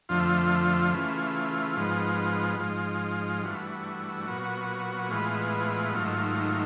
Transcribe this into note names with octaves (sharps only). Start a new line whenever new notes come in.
F2 D3 F3 A3 F4
C#3 E3 A3
G#2 F3 G#3 B3
G#2 F3 G#3
G2 E3 A3 F#4
A#2 F#3 B3
A2 E3 G#3 B3 F4
G#2 D#3 F#3 A3